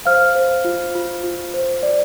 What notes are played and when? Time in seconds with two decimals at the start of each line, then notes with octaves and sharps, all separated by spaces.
0.05 C5 F5 F6
0.35 C5
0.65 F4
0.95 F4
1.24 F4
1.54 C5
1.83 D5